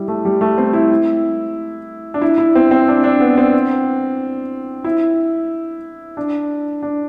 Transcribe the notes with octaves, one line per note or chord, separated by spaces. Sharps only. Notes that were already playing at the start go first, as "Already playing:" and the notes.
Already playing: G3 E4
A3
G3
A3
C4
E4
D4
E4
E4
C4
C4
D4
D4
B3
C4
E4
D4
D4